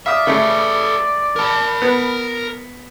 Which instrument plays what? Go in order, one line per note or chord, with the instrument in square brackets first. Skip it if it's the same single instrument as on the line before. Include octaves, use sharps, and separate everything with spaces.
[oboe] D5 [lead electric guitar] E5 [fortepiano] F5 D#6
[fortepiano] C#3 A3 [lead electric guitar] A4 B4
[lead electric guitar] A#4 A5
[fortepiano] B3